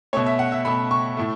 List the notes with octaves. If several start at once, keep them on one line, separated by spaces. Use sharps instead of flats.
B2 A3 C#5
E5
F#5
E5
B2 A3 B5
C#6
A2 A3